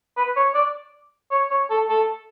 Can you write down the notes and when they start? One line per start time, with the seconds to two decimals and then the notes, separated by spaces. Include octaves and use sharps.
0.17 B4
0.36 C#5
0.54 D5
1.31 C#5
1.51 C#5
1.70 A4
1.89 A4